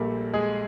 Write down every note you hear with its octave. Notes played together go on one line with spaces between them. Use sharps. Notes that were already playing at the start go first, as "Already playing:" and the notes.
Already playing: A#1 A#2 G3 A3 A#3 A4
G#3 G#4